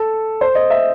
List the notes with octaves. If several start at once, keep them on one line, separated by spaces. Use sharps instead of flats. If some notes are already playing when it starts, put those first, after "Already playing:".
Already playing: A4
C5
D#5
E5